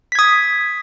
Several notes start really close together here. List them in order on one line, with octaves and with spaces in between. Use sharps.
B6 G#6 D#6